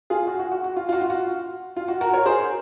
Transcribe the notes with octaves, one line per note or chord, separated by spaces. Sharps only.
F4 G#4
F#4
F#4
F#4
F#4
F4
F4
F#4
F4
F#4
F4
F#4
F#4 A#4
A#4 C#5
G#4 C5